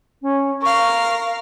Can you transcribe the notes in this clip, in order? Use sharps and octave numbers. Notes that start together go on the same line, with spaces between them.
C#4
A#4 F5 C#6